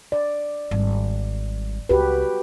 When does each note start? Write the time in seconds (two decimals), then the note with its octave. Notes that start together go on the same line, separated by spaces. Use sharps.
0.12 D5
0.71 G#1 G3
1.89 C#2 F#4 G4 B4